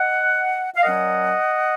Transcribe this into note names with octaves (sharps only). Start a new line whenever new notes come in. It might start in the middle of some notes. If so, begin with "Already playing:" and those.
Already playing: D#5 F#5
F5
A#2 F#3 C#4 D#5 F#5